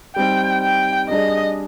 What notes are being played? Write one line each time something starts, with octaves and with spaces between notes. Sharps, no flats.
G3 C4 D#4 G5
G5
G3 D4 G#4 D5 D#5